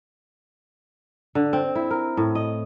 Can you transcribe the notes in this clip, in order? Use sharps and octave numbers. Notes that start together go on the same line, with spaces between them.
D3
C4
E4
A#4
A2
D#5